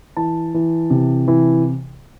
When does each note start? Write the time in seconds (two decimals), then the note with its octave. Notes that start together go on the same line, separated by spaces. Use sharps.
0.17 E3 A5
0.54 E3
0.90 C3
1.28 E3